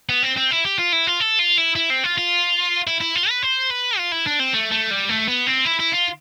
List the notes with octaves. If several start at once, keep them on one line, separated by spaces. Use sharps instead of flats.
B3
C4
C4
E4
G4
F4
E4
F4
A4
F4
E4
E4
C4
F4
F4
E4
E4
F4
B4
C5
B4
F4
E4
D4
C4
A3
A3
G3
A3
B3
C4
E4
E4
F4